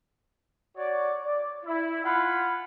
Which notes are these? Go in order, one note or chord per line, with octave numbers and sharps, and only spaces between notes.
F#4 C#5 D5
D5
E4
F4 F#5 G#5 B5